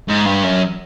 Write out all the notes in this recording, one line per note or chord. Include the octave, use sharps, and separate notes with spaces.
G#2
G2
F#2